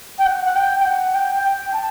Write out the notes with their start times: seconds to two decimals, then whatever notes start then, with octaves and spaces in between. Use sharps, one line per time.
0.19 G5
0.26 F#5
0.45 F#5
0.56 G5
0.79 G5
0.85 F#5
1.15 G5
1.44 G5
1.73 A5